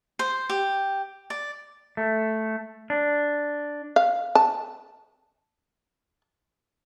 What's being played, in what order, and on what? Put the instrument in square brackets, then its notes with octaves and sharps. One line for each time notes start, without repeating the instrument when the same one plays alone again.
[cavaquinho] C5
G4
D5
[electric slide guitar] A3
D4
[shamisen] F5
A5